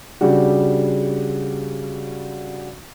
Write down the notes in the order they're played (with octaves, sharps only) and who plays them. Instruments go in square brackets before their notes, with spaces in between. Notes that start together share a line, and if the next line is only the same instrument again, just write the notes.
[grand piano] C#3 G3 D4 F#4